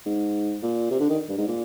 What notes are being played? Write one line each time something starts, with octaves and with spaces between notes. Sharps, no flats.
G#2
A#2
C3
D3
D#3
G2
G#2
A#2